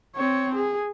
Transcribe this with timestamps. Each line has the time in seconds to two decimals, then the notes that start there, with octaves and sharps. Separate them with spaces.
0.15 C4 C#5
0.55 G#4